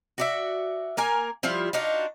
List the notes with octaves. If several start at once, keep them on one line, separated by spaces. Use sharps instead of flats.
F#4 D5 E5
A#3 A#4 G#5
F3 G3 E4 F4
D4 D#4 F4 F#4